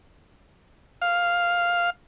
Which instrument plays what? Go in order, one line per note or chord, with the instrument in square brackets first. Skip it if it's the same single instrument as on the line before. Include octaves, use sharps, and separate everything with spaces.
[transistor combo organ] F5